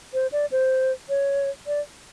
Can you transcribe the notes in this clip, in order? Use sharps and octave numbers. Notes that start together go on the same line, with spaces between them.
C5
D5
C5
C#5
D5